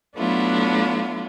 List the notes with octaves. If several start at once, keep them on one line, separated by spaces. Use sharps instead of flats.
F#3 A3 B3 D4 E4 F4